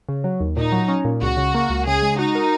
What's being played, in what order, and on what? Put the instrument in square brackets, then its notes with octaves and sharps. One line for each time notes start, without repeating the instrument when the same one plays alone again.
[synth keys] C#3
F#3
D#2
[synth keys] A#2 [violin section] D#4
[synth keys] F#3
C#4
A#2
[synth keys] C#2 [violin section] F#4
[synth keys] C#3
A#3
C#2
[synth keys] C#3 [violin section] G#4
[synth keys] G#3
[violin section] D#4 [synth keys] F#4
[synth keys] A#4